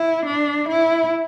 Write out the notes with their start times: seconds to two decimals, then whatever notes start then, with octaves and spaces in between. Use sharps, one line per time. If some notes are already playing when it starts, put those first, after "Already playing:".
Already playing: E4
0.26 D4
0.69 E4